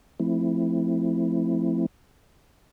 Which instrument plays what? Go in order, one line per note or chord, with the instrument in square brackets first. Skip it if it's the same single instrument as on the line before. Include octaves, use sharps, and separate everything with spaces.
[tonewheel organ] F3 A3 C4 E4